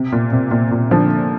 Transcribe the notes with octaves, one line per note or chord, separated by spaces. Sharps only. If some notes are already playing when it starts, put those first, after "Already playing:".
Already playing: C3
A#2
C3
A#2
A#2
D3 F3